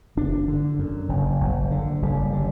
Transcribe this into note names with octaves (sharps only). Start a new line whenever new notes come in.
F#1 D4
D3
F#2
F#1
F#1
D3
F#1 G3
D3